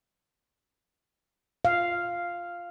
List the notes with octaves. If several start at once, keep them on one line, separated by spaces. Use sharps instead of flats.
F5